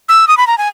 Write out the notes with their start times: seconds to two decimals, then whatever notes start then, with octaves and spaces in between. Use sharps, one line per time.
0.09 E6
0.28 D#6
0.37 B5
0.47 A#5
0.58 G#5